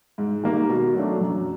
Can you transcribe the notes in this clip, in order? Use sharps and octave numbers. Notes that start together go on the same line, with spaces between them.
G#2
D#3 G3 A#3
B2
F#3 A3 D4
F#2